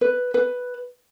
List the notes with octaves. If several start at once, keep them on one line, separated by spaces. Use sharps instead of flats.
B4
B4